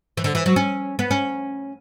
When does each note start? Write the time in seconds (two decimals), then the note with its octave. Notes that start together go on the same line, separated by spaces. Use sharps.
0.17 E3
0.24 D3
0.35 E3
0.46 F#3
0.56 C#4
0.99 B3
1.11 C#4